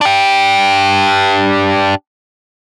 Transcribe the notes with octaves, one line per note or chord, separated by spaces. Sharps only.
D4 G4